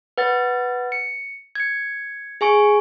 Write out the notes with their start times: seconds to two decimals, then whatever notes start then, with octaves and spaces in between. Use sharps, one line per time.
0.18 B4 F#5 A6
0.92 C#7
1.55 G#6 C#7
2.41 G#4 G#5 C#6 D7